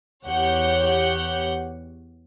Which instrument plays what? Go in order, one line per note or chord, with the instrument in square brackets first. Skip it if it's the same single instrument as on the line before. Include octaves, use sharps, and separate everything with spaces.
[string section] E2 G4 C#5 F#5 G6